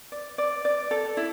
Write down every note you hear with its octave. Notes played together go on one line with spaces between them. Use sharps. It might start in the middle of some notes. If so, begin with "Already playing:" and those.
D5
D5
D5
A4
E4